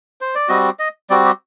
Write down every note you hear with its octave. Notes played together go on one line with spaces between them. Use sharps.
C5
D5
G3 C4 F#4 D#5
D#5
G3 C4 F#4 D5
G4